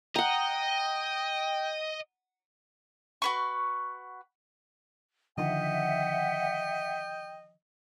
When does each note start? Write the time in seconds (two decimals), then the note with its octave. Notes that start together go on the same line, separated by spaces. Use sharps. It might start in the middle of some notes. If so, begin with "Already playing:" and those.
0.16 D#5 F#5 G5 A#5
3.22 F#4 B4 C#6
5.38 D3 D#3 F3 D#5 E5 F#5 G5